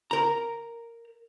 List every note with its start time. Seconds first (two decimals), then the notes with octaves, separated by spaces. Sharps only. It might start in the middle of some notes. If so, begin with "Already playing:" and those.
0.11 A#4 A#5